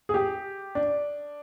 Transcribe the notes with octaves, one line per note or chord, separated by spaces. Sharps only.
G#4
G4
D4